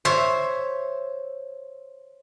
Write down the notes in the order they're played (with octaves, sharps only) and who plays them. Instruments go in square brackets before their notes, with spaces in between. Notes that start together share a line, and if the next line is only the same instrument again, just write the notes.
[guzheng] C5 C#5 E5